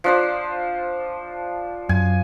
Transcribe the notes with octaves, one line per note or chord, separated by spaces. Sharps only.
F3 D4 C5
F#2 G#5